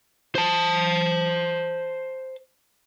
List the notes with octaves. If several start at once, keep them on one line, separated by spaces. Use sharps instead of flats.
C5 A5